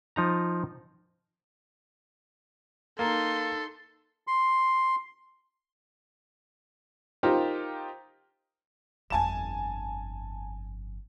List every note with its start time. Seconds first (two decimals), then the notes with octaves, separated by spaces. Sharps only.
0.16 F3 D#4 A#5
2.99 A#3 D#4 A4 C6
4.27 C6
7.23 D#4 F4 G4 A#4 C5
9.10 G1 F2 G#5 A5 E7